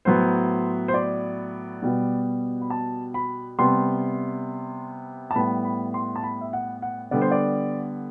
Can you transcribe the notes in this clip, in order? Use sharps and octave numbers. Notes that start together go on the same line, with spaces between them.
A2 F#3 B3 C5
C5
D5
B2 G3 B3
B5
A5
B5
C3 G3 B3 C6
A5
A2 G3 B3 B5
B5
C6
A5
B5
E5
F#5
F#5
D3 G3 B3 D5
C5
D5